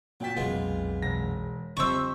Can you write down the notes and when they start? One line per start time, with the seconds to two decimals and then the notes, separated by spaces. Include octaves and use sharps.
0.20 A#2 F#3 G5 A5 B6
0.36 B1 F2 G#3 B3 F4
1.02 E1 A#6
1.77 F2 D3 G3 C5 D#5 E5 C#6 E6